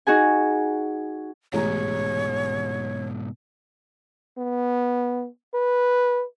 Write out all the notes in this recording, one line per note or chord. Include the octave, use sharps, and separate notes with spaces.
D#4 F#4 G#4 G#5
A1 G#2 B2 G#3 C#5 A#5
B3
B4